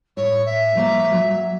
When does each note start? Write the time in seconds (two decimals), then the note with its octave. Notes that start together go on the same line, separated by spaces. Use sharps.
0.17 A2 C#5
0.46 E5
0.75 F3 A3 A#3
1.12 F#3